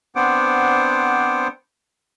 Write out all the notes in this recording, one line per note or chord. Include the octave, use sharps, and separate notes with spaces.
B3 C4 D4 C5 F#5 D6